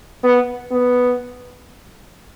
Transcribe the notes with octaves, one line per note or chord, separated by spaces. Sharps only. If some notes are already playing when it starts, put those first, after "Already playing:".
B3
B3